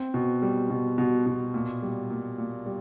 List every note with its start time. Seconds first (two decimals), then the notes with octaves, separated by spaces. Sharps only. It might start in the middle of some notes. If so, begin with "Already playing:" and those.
Already playing: C4
0.14 B2
0.42 G3
0.70 B2
0.98 B2
1.26 B2
1.54 A#2
1.82 G3
2.10 A#2
2.38 A#2
2.66 G3